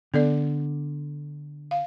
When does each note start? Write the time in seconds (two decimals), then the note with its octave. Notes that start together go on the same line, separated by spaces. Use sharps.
0.14 D3 B3 A4 D5
1.71 F5